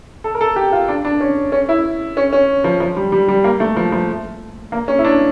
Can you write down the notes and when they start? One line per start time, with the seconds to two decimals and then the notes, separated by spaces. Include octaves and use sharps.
0.24 A4
0.35 A#4
0.41 A4
0.56 G4
0.72 F4
0.88 D4
1.05 D4
1.20 C#4
1.52 C#4
1.69 E4
2.17 C#4
2.33 C#4
2.64 F3
2.80 F3
2.96 G3
3.12 G3
3.28 G3
3.44 A#3
3.60 A3
3.77 F3
3.92 F3
4.72 A#3
4.88 C#4
4.99 E4
5.05 D4